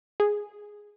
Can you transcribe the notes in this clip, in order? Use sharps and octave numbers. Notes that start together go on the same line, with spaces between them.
G#4